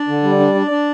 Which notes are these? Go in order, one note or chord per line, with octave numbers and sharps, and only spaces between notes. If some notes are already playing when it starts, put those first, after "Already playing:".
Already playing: D4 D5
D3
G3
D4
D4
D4